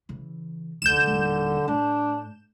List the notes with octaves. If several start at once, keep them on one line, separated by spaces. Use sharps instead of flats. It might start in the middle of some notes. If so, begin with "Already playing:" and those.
C#3 E3
F1 D2 D3 G6 E7
D#1 A1
A2 D4